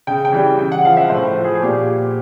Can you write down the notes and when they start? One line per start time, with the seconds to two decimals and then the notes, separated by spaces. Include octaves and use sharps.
0.07 C#3 G5
0.25 G5
0.32 E3 G3
0.58 C#3 G5
0.72 F#5
0.85 F3 F5
0.97 E5
1.10 A2 C5
1.36 F3
1.44 G#4
1.55 G#4
1.62 A#2 G4